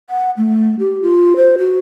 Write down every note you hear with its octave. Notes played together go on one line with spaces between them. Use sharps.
F#5
A3
G4
F4
C5
F#4